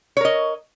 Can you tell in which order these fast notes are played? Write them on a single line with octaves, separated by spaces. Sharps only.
C#5 A#4 D#5